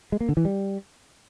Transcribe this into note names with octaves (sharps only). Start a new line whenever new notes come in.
G#3
A#3
D3
E3
G3